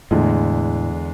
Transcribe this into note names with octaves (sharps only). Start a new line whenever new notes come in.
E2 A2 D3 G#3